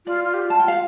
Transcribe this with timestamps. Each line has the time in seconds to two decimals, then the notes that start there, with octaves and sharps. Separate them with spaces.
0.06 F4 D5
0.24 F4
0.34 G4
0.42 F4
0.50 A5
0.60 F4 G5
0.68 F5